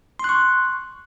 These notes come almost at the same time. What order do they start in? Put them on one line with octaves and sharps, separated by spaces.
C6 F#6 C#6